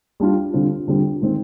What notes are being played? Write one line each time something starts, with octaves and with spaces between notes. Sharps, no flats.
G3 D4 F4
D3 G3 C4 F4
D3 G3 C4 F4
D#3 G#3 C4